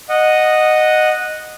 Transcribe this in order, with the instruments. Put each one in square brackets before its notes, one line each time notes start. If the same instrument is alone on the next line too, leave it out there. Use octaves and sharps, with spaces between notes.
[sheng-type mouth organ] D#5 F#5